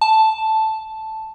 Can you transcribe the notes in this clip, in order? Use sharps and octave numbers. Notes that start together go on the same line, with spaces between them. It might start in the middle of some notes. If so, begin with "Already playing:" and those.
A5